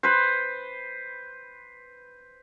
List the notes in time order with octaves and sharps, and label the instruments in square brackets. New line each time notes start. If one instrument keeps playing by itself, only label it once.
[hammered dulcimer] B4 C5